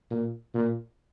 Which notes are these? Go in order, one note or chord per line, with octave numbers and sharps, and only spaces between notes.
A#2
A#2